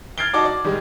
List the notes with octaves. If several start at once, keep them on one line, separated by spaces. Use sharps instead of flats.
F6 G#6 A6 C7 D7 G7
D#4 F#4 D5 A5 D6
D5
D#3 G3 G#3